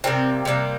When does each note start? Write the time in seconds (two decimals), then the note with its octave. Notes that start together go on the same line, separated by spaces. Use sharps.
0.04 C3 G3 A#3 C4
0.45 C3 G3 A#3